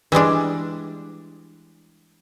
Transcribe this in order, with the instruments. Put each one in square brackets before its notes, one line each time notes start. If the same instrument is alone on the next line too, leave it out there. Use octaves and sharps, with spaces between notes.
[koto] E3 G3 G#3 D4